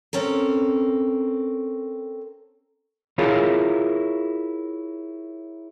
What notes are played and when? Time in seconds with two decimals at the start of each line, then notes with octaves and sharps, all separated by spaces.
0.13 C4 C#4 A4 A#4
3.18 E4 F4 G#4 A#4 C#5 F5